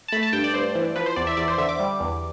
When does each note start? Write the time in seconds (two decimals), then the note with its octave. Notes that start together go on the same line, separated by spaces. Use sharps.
0.08 A5
0.12 A3 B5
0.23 A5
0.33 G2 G5
0.44 D5
0.54 G2 C5
0.75 E3
0.96 F3 B4
1.06 C5
1.16 E2 D5
1.27 E5
1.37 E2 D5
1.48 C5
1.58 D3 E5
1.69 D6
1.80 G3
2.00 E2